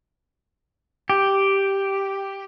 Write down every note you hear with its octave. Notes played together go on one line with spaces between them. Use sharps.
G4